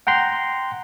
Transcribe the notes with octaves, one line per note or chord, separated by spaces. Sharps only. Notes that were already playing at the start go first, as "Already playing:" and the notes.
F#5 G5 A#5 C6